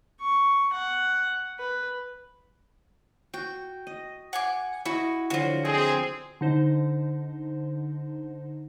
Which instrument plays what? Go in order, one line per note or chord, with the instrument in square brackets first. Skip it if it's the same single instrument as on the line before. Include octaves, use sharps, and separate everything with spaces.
[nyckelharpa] C#6
F#5
B4
[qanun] F#4 [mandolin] G5
[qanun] D#5
[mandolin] F#5 G#5 D6
[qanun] E4 D#5 [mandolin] F#4
[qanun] D3 F3 F#3 [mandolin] F4 F#4
[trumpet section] C4 G#4 [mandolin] D#5
[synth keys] D3 D#4 C5